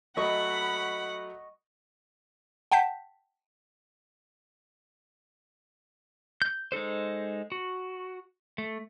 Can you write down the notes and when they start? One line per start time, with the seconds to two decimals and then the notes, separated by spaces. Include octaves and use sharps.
0.17 F#3 A3 D#5 F#5 B5 C#6
2.72 F#5 G5 A5 G6 B6
6.42 G6
6.72 G#3 D#4 A4 C5
7.52 F#4
8.58 A3